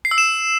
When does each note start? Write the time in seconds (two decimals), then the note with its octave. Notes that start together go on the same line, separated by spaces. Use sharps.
0.05 C7
0.11 E6
0.18 E7